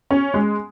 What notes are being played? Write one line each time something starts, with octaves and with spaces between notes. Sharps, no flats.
C#4
G#3